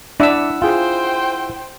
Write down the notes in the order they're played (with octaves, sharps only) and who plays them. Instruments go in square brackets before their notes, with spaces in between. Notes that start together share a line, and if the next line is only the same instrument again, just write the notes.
[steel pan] D4 E5 D6 [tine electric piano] E4 F#5 E6 [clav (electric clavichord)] D5
[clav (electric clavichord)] F4 G#4 [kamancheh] C5 G5